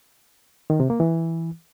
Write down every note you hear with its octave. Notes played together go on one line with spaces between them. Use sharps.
D#3
C3
A#3
E3